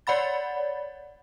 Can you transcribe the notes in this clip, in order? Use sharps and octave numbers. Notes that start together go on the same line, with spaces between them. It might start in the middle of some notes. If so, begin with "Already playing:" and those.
C#5 D5 F#5 B5 A6